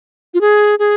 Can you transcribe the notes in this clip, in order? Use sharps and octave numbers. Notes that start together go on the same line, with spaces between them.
F4
G#4
G#4